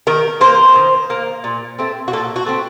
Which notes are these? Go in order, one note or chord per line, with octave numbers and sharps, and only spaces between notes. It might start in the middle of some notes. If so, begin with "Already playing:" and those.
D#3 A#4
A#3 C5
D#3
A#3
A#2
A3 C4
F#4
A#2 A4
F#4
A3 C4